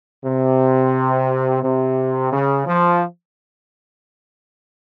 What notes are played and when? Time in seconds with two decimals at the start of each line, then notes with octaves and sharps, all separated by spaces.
0.24 C3
1.63 C3
2.32 C#3
2.67 F3